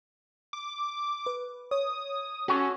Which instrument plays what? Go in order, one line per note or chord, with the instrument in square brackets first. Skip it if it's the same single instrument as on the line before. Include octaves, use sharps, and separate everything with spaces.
[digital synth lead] D6
[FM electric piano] B4
[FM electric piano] C#5 [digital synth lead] D#6
[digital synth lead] C#4 [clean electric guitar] F#4 A4 C#5